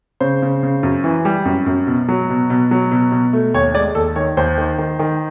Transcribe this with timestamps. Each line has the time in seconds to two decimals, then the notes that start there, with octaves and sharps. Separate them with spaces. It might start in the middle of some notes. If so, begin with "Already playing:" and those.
0.20 C#3 C5
0.42 C#3
0.63 C#3
0.83 F#2
1.04 E3
1.25 G3
1.45 F#2
1.66 F#2
1.87 B2
2.08 F#3
2.30 B2
2.50 B2
2.71 F#3
2.91 B2
3.12 B2
3.33 A3
3.54 D#2 C#5
3.74 G#3 D5
3.95 D#2 A4
4.16 D#3 C#5
4.37 D#2 C5
4.58 D#3
4.78 D#3
4.99 D#3